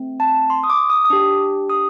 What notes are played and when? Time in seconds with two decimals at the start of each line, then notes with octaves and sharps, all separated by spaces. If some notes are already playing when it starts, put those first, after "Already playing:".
Already playing: A3 C4
0.20 A5
0.50 C6
0.64 D#6
0.70 D6
0.90 D#6
1.05 D#6
1.10 D4 G4
1.70 D#6